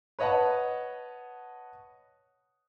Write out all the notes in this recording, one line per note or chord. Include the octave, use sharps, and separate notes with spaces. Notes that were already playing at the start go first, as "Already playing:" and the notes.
B4 C#5 D#5 F#5 A5